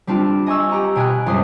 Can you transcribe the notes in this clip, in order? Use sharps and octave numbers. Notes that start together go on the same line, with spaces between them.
G3 C4 D4 F4
D#5 G#5 C#6 E6
G4 F#5 A#5
B2 G5 G#5 D#6 F6 F#6
C#2 F#2 G3 C5 C6 D#6